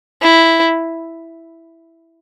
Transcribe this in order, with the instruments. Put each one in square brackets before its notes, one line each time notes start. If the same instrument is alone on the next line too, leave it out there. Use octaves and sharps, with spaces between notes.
[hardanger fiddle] E4